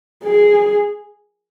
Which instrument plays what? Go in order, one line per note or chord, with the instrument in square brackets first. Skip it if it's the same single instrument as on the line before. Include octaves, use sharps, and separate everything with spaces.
[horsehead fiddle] G#4